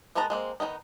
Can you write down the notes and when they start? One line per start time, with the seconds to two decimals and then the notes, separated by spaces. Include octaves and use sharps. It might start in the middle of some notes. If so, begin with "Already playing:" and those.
0.15 D#3 G#3 B3 A5 A#5
0.30 G#3 A#3 C4
0.60 D#3 F#3 B3 D#4